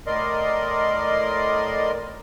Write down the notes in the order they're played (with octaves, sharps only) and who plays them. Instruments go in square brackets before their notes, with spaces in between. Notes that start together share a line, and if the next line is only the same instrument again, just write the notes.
[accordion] A2 A#4 D5 D#5 C6